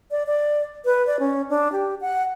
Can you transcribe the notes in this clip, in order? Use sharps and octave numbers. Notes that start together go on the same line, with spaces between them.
D5
D5
B4
D5
C#4
D4
G4
F#5